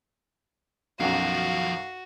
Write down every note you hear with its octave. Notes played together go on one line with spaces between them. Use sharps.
B1 F#2 F3 F#3 F#4 F5